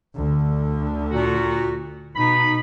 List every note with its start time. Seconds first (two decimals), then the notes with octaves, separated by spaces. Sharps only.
0.15 D2 D3
1.11 A#2 F#4
2.16 B2 D#4 B5